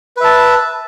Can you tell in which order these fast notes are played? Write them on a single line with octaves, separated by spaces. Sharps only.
B4 E5 A5